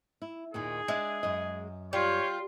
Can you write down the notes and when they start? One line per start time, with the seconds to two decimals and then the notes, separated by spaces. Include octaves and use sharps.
0.22 E4
0.54 D#2 A#2 D#3 G#4
0.88 G#3 D4 E5
1.23 F#2 D#5
1.93 G3 F4 C#5